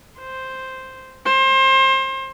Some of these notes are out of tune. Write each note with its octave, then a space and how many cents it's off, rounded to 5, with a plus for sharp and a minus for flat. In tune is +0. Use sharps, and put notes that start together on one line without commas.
C5 +0
C5 +30